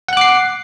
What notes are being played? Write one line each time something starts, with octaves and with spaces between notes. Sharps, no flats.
F#5 D6 F#6 C7